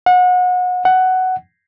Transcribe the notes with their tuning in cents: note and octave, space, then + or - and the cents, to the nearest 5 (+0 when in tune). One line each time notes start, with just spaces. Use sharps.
F#5 -30
F#5 +10